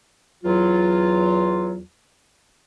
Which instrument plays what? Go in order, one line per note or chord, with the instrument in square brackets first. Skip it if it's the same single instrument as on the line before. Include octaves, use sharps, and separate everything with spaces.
[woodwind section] E2 F#3 F4